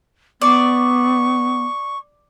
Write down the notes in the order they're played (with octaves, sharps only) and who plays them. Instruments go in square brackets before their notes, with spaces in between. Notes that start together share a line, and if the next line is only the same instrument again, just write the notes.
[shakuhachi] B3 [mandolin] D5 [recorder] C#6